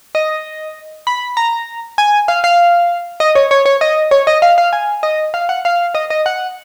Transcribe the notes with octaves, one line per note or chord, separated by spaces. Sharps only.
D#5
B5
A#5
G#5
F5
F5
D#5
C#5
C#5
C#5
D#5
C#5
D#5
F5
F5
G#5
D#5
F5
F#5
F5
D#5
D#5
F#5